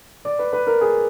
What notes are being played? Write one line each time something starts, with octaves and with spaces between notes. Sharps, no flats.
D5
B4
B4
A#4
G#4